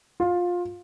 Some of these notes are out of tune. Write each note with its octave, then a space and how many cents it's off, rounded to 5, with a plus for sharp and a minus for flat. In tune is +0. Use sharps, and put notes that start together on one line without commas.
F4 +20